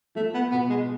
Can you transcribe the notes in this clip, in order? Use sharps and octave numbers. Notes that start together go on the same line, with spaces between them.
F3 A3
B3
B2 B3
G#3